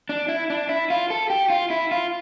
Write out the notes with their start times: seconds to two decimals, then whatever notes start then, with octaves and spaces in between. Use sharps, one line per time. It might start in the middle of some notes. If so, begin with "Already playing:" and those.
0.09 D4
0.29 E4
0.50 D4
0.69 E4
0.90 F4
1.10 A4
1.30 G4
1.50 F4
1.70 E4
1.91 F4